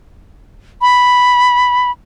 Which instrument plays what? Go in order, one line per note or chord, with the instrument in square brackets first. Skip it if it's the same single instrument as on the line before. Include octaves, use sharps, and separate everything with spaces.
[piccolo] B5